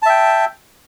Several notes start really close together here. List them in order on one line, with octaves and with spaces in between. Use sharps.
A5 E5 G5